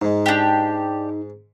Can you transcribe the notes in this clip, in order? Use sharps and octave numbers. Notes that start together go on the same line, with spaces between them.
G#2 G#3 D#4
D4 G4